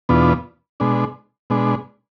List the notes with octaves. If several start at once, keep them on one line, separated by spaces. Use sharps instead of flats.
E2 B2 B3 D4 F4
B2 G#3 D4
B2 G#3 D4